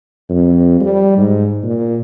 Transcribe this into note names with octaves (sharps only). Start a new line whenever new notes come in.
F2
G3
G#2
A#2